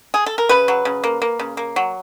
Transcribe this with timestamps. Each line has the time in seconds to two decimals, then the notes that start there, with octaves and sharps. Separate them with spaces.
0.14 G#4
0.26 A4
0.38 A#4
0.49 C#3 B4
0.68 F#3
0.85 C#3
1.04 A#3
1.22 A#3
1.39 C#3
1.57 A#3
1.76 F#3